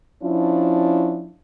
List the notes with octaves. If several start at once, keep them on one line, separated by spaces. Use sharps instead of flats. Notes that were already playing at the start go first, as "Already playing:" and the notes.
F3 C#4 D4 E4